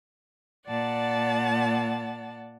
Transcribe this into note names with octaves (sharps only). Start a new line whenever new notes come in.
A#2 D5 F#5 A5